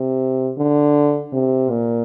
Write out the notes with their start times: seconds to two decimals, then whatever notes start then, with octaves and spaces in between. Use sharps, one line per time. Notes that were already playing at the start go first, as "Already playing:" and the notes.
Already playing: C3
0.57 D3
1.33 C3
1.70 A#2